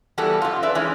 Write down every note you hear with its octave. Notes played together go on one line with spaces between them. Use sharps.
E3 G3 B3 F#4 A4
F#2 F4
B4 D5 E5
E3 G#3 C#4